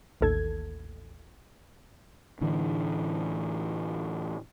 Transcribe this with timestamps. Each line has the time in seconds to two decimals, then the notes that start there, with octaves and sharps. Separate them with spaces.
0.21 A1 D#2 A4 G#6
2.41 A2 D3 E3